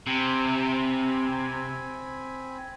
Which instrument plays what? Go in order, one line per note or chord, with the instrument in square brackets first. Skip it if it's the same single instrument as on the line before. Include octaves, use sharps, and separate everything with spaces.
[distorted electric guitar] C3 [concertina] C4 G#5 B5